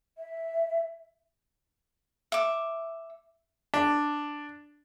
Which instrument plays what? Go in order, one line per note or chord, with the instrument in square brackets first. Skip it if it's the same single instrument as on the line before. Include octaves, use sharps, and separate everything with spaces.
[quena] E5
[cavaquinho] E5 D6
[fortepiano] D4